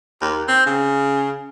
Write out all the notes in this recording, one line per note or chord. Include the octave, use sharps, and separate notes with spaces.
D#2
C4
C#3